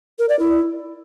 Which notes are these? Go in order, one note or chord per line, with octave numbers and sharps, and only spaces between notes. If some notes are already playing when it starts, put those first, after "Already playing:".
A#4
D5
E4